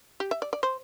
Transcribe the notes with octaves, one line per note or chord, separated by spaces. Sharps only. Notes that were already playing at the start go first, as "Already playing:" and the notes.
G4
E5
D5
D5
C5